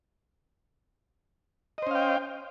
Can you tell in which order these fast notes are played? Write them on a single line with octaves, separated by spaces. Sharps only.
D#5 C5 C#4 F5 G5